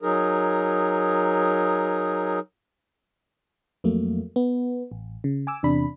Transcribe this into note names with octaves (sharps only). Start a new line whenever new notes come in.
F#3 D#4 G#4 A#4
F2 F#3 A3 A#3
B3
A1
C#3
G#5 D6 E6
E2 C3 D4 B5